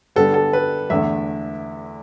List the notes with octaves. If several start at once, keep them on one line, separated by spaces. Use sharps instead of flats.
D3 G3 B3 A4
A4
B4
E2 D3 A3 E5